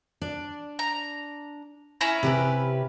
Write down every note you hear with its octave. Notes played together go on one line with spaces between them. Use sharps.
D4
A#5
C#4 E4 A#5
C3 G4 B4